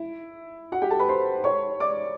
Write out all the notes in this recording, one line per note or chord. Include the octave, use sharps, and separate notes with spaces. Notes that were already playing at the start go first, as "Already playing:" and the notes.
Already playing: E4
F#4 F#5
G4 G5
A4 A5
B4 B5
C5 C6
C#5 C#6
D5 D6